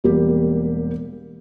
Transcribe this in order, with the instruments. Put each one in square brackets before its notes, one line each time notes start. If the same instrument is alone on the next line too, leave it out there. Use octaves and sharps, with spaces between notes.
[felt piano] E1 G3 A#3 G4